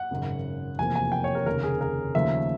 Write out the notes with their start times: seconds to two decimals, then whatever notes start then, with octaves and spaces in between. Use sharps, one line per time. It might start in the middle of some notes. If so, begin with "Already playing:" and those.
Already playing: F#5
0.11 G#1 F#2 C#3
0.79 F1 E2 C3 F3 A#3 G#5
0.96 G#5
1.12 G5
1.24 C#5
1.35 A#4
1.46 F1 D#2 C#3 A#4
1.63 G#4
1.81 A#4
2.15 D#2 C#3 F3 A3 E5